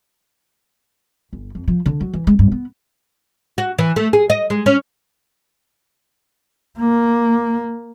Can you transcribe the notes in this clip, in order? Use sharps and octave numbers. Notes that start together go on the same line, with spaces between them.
G1
F2
F3
D3
F#3
E3
G#3
G2
B3
F#4
E3
A3
G#4
D#5
G#3
C#4
A#3